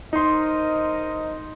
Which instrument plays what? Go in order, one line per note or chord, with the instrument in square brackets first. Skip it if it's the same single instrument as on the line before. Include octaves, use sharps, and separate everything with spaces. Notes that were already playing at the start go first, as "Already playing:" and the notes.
[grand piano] D#4 C6 [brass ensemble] A#4 C5 D#5